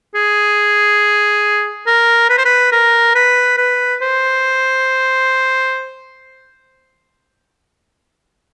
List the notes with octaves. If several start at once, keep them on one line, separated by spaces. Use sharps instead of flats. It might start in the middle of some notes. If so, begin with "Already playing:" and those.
G#4
A#4
B4
C5
B4
A#4
B4
B4
C5